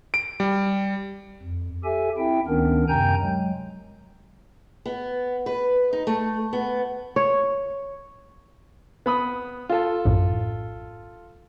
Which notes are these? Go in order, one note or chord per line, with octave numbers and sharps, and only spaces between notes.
D7
G3
F2
G4 A4 E5 G#5
C4 E4 E5 G5
D2 D#3 B3 C#4 D4 A#4
F#2 C3 G5 G#5 A#5 G6
F#3 G#3
B3
B4
D#4
A3
B3
C#5
B3 B5 D#6
F4 A4
A#1 F#2 A2